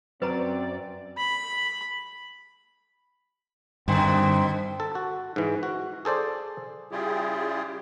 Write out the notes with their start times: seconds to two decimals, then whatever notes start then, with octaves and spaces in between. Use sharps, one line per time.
0.22 F#2 F#3 C4 B4 D5 A#5
1.17 B5
3.88 G2 B2 D3 D#3 C4
4.80 A4
4.95 F#4
5.36 G#2 E3
5.63 F#4
6.05 G#4 A4 C5 D5
6.92 C#3 G3 E4 F4 G4 G#4